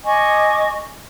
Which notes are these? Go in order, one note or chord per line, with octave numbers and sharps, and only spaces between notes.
D#5 G#5 C#6 D6